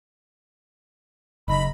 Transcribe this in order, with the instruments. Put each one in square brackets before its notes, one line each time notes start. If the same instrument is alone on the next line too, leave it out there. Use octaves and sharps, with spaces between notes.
[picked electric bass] F#1 [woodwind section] D#4 A#5 B5